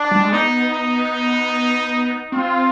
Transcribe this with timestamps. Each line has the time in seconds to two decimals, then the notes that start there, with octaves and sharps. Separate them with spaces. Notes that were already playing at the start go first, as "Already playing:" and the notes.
Already playing: D4
0.11 G3
0.21 G#3
0.32 B3 D#4
0.72 D#4
2.32 C4 F4